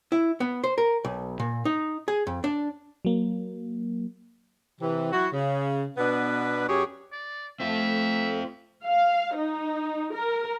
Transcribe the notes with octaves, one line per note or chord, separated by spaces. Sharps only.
E4
B3
C5
A#4
B1
A#2
D#4
G#4
F2
D4
F#3 A#3
C3 E3
F#3 E4 F#4
C#3
B2 B3 D4 B4
F#2 C#4 G4 G#4 C#5
D5
A3 C4 F4 E5
F5
D#4
A#4